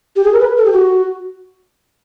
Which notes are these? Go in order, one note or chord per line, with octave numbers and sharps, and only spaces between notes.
G4
G#4
A#4
B4
A4
G4
F#4